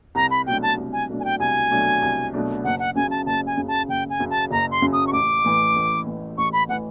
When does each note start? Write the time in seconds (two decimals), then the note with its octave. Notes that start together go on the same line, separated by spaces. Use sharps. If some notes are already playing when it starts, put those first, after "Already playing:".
0.15 C2 A#5
0.31 B5
0.46 B2 F#3 A3 D4 G5
0.63 A5
0.77 C2
0.93 G#5
1.09 B2 F#3 A3 D4
1.20 G#5
1.25 G5
1.40 C2 G#5
1.70 B2 F#3 A3 D4
2.02 C2
2.33 B2 F#3 A3 D4
2.64 F#1 F#5
2.80 F#5
2.95 F#2 C#3 G#5
3.11 A5
3.26 F#1 A5
3.47 G#5
3.57 F#2 C#3
3.68 A5
3.88 F#1 G5
4.10 G#5
4.20 F#2 C#3
4.31 A5
4.51 F#1 A#5
4.71 C6
4.82 F#2 C#3
4.93 D#6
5.07 C#6
5.13 A1 D6
5.44 A2 E3
5.76 A1
6.06 A2 E3
6.38 A1 C#6
6.53 B5
6.69 A2 E3 F#5